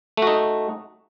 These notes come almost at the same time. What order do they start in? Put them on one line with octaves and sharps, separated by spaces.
A3 F#4 D#4